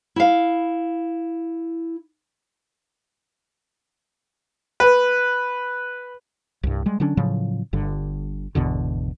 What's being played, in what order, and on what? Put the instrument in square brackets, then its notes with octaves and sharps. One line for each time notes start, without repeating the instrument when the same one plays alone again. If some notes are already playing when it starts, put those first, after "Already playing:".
[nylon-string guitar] E4 F5
[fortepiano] B4
[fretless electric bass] C2 G2
G3 G#3
D3 F#3 C#4 D4
A2 C#3 F3 F#3
G1 G2 D3
G#1 E2 B2 D3